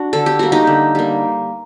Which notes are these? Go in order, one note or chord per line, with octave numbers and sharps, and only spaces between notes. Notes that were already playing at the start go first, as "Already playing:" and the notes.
Already playing: D4 F#4
D3 A4
G4
G3 A#3 F#4
D#4 G4
D3
G3 A#3